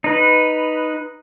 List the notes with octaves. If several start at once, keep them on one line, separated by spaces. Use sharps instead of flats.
D#4 B4